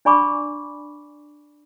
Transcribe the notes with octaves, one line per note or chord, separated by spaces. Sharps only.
D4 D5 G#5 B5 C#6 D6